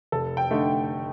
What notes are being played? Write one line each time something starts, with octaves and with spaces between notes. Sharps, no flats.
F1 A4
G5
D3 A3 D#4